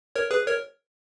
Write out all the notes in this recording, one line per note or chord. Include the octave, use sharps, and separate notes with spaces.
A#4 C#5
G#4 B4
A#4 C#5